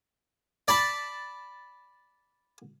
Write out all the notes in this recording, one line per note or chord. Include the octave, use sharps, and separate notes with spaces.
D5 A5 B5